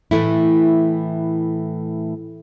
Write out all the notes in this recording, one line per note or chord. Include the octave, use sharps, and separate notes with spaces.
A2 E3 A3 E4